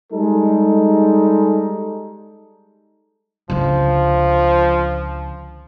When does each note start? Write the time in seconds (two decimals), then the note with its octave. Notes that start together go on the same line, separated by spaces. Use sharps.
0.12 G3 G#3 D#4 A4
3.50 C#2 D3 F3